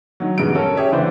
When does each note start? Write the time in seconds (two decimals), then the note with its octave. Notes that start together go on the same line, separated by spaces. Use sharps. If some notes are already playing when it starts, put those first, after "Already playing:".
0.20 D3 D#3 F#3
0.38 E1 G2 C#3 E3 D7
0.55 C#4 A4 A#4
0.77 G4 G#4 C#5 E5
0.92 F#1 D3 E3 C5 D5